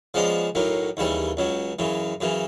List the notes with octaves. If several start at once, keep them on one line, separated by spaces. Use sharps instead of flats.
C#3 F3 G#3 B3 D4
B1 A2 F#3 A#3
D#2 C#3 E3 G3
C#2 C#3 F#3
F#2 C#3 E3
F#2 C#3 E3